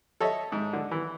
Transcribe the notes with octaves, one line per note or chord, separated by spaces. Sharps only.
A4 C#5 D#5 E5
G#2
D3
E3